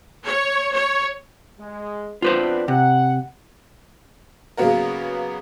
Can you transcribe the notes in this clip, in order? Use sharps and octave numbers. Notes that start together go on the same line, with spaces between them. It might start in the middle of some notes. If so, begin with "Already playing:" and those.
C#5
C#5
G#3
B3 C4 D4 F4 B4 C5
C3 F#5
C#3 F#3 A#3 B3 F#4 A#4